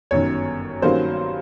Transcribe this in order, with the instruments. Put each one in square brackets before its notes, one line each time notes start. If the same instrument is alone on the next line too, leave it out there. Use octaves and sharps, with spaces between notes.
[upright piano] G1 F#2 D#3 C#5
G2 D#3 F#3 A#3 C#4 C5